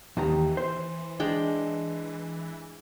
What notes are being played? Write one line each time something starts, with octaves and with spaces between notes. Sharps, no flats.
D#2 D#3 E3 A#5
C5
G#3 D4 G5